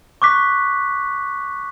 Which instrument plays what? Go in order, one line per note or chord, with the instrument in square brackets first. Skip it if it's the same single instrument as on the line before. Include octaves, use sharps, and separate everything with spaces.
[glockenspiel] C#6 D6 F#6 B6